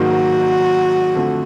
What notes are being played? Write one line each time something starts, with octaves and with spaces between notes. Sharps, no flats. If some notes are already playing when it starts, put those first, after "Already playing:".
Already playing: G#2 D#3 F#3 A#3 F#4
F2 D3 F3 A3